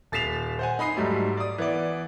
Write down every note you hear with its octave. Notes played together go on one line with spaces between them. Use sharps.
D#1 A6 B6 C7 E7 F7
C5 F#5 G#5
D#4 B5 D#6 C7
G#2 F#3 G3 A3
D5 D#6
E3 B3 D5